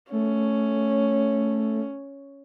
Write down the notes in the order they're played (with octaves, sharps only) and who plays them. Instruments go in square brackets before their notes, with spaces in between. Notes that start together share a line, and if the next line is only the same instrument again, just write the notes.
[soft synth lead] A3 [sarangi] C#4